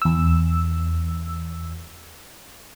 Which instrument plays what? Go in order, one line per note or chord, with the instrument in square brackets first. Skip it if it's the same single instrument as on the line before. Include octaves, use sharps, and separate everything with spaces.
[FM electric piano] E2 E6